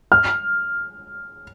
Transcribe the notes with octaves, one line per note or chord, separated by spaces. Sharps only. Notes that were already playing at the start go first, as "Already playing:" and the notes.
F6